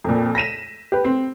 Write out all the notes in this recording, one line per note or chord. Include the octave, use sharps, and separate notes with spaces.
F2 A#2
A#6 B6 D#7 E7
G4 B4
C4